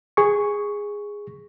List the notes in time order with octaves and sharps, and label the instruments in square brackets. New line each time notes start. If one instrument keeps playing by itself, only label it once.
[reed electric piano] G#4 C#6